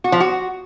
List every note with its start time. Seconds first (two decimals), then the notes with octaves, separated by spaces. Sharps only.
0.04 F#4
0.12 F3
0.20 F#4